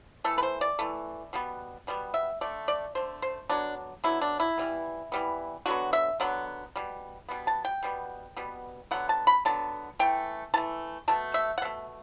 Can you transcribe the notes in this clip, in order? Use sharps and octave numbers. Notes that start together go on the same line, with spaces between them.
E3 A3 A4
B4
C5
D5
E3 A3
B2 G3 B3
B2 G3 B3
E5
D3 A3 D5
D5
D3 A3 C5
C5
D3 F#3 B3 D4
D3 F#3 B3 E4
D4
E4
E3 G3 B3
E3 G3 B3
D3 F#3 B3 F#4
E5
D3 F#3 B3 F#5
B2 G3
B2 G3 B3
A5
G5
B2 G3 B3
B2 G3 B3
D3 F#3 B3 F#5
A5
B5
D3 F#3 B3 A5
E3 A3 G5
E3 A3 A5
B2 A3 A5
E5
F#5
B2 A3 E5